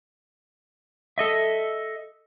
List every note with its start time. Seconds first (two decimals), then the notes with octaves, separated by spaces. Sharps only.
1.18 A4 D#5 E5